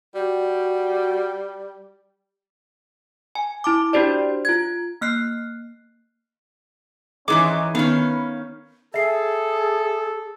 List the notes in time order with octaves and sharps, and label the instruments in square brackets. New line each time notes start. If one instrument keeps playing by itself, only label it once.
[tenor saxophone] G3 [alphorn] F#4
[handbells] G#5
E4 A5 D6
D4 F#4 G4 C5 D5
F4 G#6
A#3 F6 F#6 C7
[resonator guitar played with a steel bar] G#2 E3 G#3 [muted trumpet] C#4 [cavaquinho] D#4 D6
[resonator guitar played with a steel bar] D#3 C#4 [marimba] B3 [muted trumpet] B4 [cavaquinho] F5
[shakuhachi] G#4 [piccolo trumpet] A4 [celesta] E5 C7